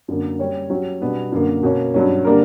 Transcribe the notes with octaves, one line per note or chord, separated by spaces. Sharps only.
F#2 D3 A#3
G3 C#4 G4 C#5
F#3 C#4 G4 C#5
B2 G3 B3 D4
F#2 D3 A#3
B2 A#3 C#4
G2 F#3 C#4
D3 G3 A#3 D4 A#4